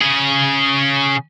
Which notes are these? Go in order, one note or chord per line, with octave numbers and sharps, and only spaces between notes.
C#3 G#4